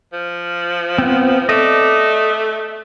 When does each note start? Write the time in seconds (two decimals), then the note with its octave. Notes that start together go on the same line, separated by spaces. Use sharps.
0.13 F3
0.98 B3 C4
1.49 A3 D5 D#5